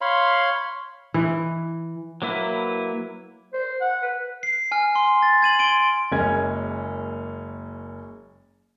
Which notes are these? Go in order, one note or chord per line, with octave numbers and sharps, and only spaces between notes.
C#5 F5 B5 C6
E3
F#3 A#3 E4 B4
C5
F#5
B4
C7
G#5 F6
C6
A6
G#6 D#7 F#7
C6 G#6 D7 D#7
F#1 G#3 A#3 C#4 G#6